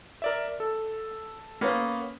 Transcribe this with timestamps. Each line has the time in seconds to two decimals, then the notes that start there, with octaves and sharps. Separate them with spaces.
0.22 A#4 D5 E5
0.60 A4
1.61 A#3 B3 C#4